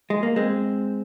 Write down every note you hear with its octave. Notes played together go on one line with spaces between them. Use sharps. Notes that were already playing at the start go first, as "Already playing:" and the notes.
G#3
A#3
G#3 C4